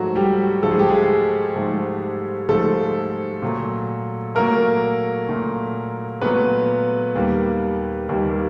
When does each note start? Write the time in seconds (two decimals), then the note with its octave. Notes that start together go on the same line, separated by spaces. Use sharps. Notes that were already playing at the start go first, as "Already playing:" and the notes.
Already playing: G#2 F3 F#3 A3 F#4
0.15 G3 G4
0.63 G#2 F3 A3 A4
0.71 G#4
0.79 G4
0.88 G#3 G#4
1.56 G#2 F3 A3
2.49 G#2 F3 A3 A4
3.42 A#2 F#3 A3
4.35 A#2 F#3 A3 A#3 A#4
5.29 A#2 F#3 A3
6.21 A#2 F#3 A3 B3 B4
7.15 D#2 D#3 G3 A#3
8.09 D#2 D#3 G3 A#3